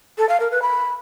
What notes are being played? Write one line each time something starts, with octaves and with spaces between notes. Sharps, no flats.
A4
F5
A#4
B4
B5